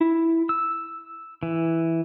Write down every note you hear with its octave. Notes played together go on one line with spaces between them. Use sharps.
E4
E6
E3